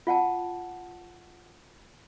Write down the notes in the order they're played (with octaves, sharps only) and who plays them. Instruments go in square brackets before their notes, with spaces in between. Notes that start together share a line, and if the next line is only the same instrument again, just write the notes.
[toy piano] F4 F#5 G5 A5